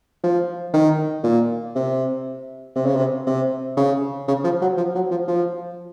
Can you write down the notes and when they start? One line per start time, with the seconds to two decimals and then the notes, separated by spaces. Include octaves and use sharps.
0.23 F3
0.73 D#3
1.23 A#2
1.75 C3
2.75 C3
2.86 C#3
2.96 C3
3.26 C3
3.77 C#3
4.28 C#3
4.44 F3
4.61 F#3
4.77 F3
4.95 F#3
5.11 F3
5.27 F3